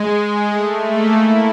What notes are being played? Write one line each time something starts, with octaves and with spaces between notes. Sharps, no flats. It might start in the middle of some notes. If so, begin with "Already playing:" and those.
Already playing: G#3
A3
A#3
E4